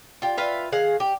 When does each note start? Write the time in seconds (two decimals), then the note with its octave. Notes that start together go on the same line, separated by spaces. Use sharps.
0.22 F4 G4
0.37 F4 B4 E5 F5
0.72 D#3 G#4 F5 F#5
1.00 G4